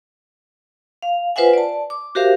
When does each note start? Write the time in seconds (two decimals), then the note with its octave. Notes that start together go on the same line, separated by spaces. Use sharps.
1.02 F5
1.36 F4 B4 C5 E5 F#5 G#5
1.53 D5 A5
1.90 D6
2.15 F#4 G4 A#4 C5 E5 F5